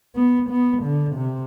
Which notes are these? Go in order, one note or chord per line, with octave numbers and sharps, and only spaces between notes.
B3
B3
D3
C3